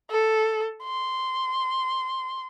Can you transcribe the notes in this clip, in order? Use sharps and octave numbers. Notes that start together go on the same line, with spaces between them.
A4
C6